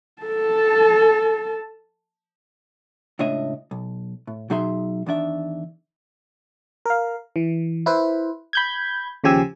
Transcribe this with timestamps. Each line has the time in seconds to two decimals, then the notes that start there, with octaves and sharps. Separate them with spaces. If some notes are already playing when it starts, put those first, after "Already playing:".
0.22 A4 A5
3.19 C#2 A2 D4 C#5 D#5 E5
3.71 B1
4.27 A2
4.50 B2 F#3 D#4 G#4 E5 C6
5.06 E2 D#3 D4 E5
6.86 A#4 F5
7.36 E3
7.86 E4 B4 C5
8.53 B5 G6 G#6
9.24 D#2 C#3 F3 G4 G#5 E6